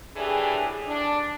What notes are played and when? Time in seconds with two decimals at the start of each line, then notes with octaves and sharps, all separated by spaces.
0.15 A2 E3 D4 G4 G#4
0.87 D4